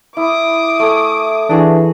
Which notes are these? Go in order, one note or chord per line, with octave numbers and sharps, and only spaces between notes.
E4 D6 D#6
A3 G#5
E3 D4 F#4 G#4 B4